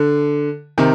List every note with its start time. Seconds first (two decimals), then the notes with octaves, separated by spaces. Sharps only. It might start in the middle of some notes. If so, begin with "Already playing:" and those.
Already playing: D3
0.78 C3 D#3